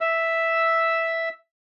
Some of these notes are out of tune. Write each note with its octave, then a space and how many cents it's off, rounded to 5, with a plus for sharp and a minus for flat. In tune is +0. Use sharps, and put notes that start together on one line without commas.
E5 +0 E6 +0